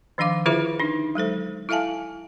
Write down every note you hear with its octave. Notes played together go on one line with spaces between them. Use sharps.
D#3 F3 D4 F5 D6
D3 E4 F4 G#4 C5 E5
D4 D#4
F#3 G#3 A4 C5
E4 A4 E5 F5 G#5 A5